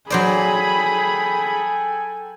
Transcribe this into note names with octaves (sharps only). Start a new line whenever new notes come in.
F#3 G#4 A4 C5 D5 G5 G#5 B5